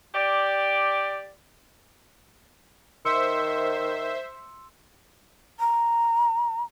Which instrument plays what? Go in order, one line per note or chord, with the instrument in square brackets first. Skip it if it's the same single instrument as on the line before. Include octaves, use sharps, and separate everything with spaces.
[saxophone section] G4 D5
[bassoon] D#3 [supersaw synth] C5 E5 [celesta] C6 E6 C#7
[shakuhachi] A#5